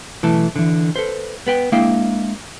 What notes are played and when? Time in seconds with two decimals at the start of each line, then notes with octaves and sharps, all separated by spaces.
0.23 B1 E3 A3 A5
0.56 D3 E3
0.96 A4 B4 C5
1.47 B3 B4 G5
1.72 G#3 A#3 D4 E4 F5 G5